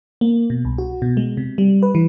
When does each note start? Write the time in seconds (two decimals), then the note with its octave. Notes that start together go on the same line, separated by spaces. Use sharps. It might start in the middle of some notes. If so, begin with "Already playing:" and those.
0.21 A#3
0.50 B2
0.65 C2
0.78 F#4
1.02 B2
1.17 G#3
1.37 C3
1.58 G3
1.83 B4
1.95 E3